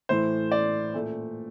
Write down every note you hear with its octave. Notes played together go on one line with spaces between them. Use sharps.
A2 E3 A3 C5
D5
A#2 A3